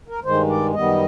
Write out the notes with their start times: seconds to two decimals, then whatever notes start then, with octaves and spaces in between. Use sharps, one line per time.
0.08 A#4
0.24 G2 D#3 G#3 C5
0.50 D5
0.74 F#2 D#3 G3 B3 D#5